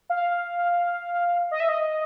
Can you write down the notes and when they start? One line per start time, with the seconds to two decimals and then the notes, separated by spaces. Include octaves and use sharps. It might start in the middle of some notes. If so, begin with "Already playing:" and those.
0.10 F5
1.51 D#5
1.60 E5
1.69 D#5